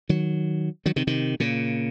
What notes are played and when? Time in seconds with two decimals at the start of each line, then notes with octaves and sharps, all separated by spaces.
0.09 D#3 F#3
0.86 D#3 F#3
0.96 C3 D#3
1.07 C3 D#3
1.40 A#2 C#3